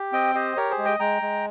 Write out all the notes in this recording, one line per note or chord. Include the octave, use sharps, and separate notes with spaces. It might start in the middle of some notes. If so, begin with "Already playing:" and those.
Already playing: G4
C4 D#5 G5
G4 C5 D#5
G4 A#4 C#5
G#4 C5
G#3
D#5 G5
G#3 G5 A#5
G#3